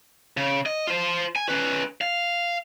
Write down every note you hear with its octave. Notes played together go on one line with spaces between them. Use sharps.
C#3
D#5
F4 C5
G#5
C#4 B4
F5